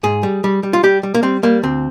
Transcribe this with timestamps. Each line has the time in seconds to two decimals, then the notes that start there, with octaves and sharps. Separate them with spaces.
0.03 G#2 G#4
0.23 G3
0.44 G3
0.63 G3
0.73 F4
0.83 G3 G4
1.03 G3
1.14 A#3
1.23 G3 C4
1.43 G3 A#3
1.63 D2 C4